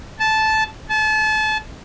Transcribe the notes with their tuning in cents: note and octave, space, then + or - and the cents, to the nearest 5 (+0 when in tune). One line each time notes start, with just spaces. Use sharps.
A5 -10
A5 -30